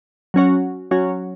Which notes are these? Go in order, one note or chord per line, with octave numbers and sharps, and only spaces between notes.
F#3 C#4 F#4 C#5
F#3 C#4 F#4 C#5